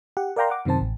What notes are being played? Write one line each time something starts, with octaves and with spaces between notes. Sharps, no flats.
G4 F#5
A#4 D5 F5 G5 A#5 C6
F#5 D6
F#2 C3 D#3 C4 C5 A5
A1